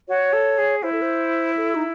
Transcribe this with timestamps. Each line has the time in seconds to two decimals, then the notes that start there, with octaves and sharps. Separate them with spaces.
0.08 F#4 C#5
0.33 A4
0.58 G#4
0.83 E4 C5
0.92 A4
1.02 C5
1.57 A4
1.75 D#4